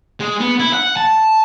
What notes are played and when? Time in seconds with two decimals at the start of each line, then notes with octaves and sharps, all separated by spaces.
0.20 G#3
0.40 B3
0.60 E4
0.73 F#5
0.97 A5